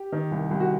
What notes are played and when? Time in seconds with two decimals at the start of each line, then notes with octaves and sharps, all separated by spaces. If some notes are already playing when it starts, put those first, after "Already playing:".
Already playing: G4
0.12 D#3
0.31 C2
0.51 C2
0.60 F#4